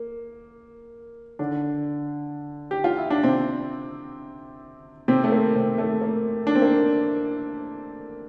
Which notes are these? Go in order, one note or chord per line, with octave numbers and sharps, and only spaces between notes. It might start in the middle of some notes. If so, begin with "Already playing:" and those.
Already playing: A#3
D3 D4
G4
F4
E4
D4
C3 C4
C3 C4
A3
A#3
C3 C4
A3
A#3
D4
C4
A#3